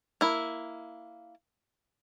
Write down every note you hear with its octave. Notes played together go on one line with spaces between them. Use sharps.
A#3 E4